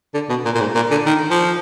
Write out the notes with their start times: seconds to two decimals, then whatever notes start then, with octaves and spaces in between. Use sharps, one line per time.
0.14 D3
0.30 B2
0.45 A#2
0.55 A#2
0.60 G#2
0.75 A#2
0.91 D3
1.06 D#3
1.31 F3